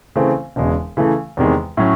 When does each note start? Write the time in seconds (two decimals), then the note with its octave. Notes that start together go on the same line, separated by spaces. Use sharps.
0.16 C#3 E3 A3 C4
0.56 E1 E2 C#3 G#3
0.97 C#3 E3 A3
1.37 E2 C3 D#3 G#3
1.77 A2 F#3 C#4